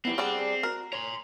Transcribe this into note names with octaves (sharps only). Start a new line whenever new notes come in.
B3 C4 E4 G4
G3 D4 G#4 D5 F#5
G#4
F#4 A#4
C#5 A#5 C6